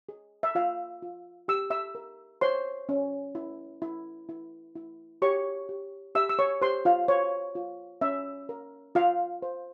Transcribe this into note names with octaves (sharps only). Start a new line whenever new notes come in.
G#4
E5
F4 F5
F4
G4 E6
E5 E6
A#4
C5 C#5 C6
C#4
E4
E4
E4
E4
G4 C#5 C#6
G4
G4 E5 E6
E6
C#5 C#6
G4 C5 C6
F4 F5
C5 C#5
F4
C#4 E5
A#4
F4 F5
C5